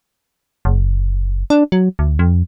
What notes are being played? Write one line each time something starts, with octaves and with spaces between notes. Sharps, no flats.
F#1
D4
F#3
D2
F2